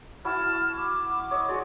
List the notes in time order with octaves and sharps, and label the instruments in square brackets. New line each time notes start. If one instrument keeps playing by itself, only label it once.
[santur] E4 F#4 B5 [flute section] A5 F6
[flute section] D6
[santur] C#5 D#5
[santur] G#3 D5 [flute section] F#4